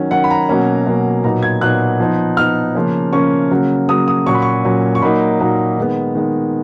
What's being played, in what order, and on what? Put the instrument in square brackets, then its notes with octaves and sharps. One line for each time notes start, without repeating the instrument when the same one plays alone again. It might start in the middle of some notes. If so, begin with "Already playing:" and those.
Already playing: [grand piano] D#3 F#3 C#4
D#3 F#3 C#4 F#5
B5
A#5
B2 F#3 A#3 C#4
B2 F#3 A#3 C#4
A#2 F#3 B3 D#4 A#5
G#6
A#2 F#3 B3 D#4 F#6
F3 B3 D#4
F3 B3 D#4 F6
C#3 F3 A#3 C#4
C#3 F3 A#3 C#4 C#6
C#3 F#3 A#3
C#3 F#3 A#3 D#6
D#6
A#2 F#3 C#4 C#6
B5
C#6
A#2 F#3 C#4
C#6
A#2 F#3 A#3 D#4 B5
A#2 F#3 A#3 D#4
D#3 G#3 B3
D#3 G#3 B3